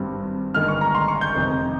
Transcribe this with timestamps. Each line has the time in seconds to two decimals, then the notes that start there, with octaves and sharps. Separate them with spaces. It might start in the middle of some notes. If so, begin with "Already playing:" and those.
Already playing: G#1 G2 G3 C4
0.55 G1 G2 D#3 G#3 F6
0.68 C#6
0.81 A#5
0.95 C6
1.08 C#6
1.21 G6
1.35 F1 F2 C3 D#3